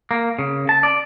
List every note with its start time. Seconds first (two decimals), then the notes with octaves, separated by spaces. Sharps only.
0.11 A#3
0.39 C#3
0.69 A5
0.83 D5